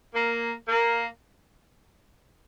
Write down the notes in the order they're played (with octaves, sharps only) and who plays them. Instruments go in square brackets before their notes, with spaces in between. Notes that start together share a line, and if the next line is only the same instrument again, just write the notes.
[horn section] A#3
A#3